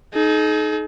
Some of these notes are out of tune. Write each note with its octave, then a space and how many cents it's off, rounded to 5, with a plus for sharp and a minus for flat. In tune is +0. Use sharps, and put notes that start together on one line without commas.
D#4 +0 G#4 +45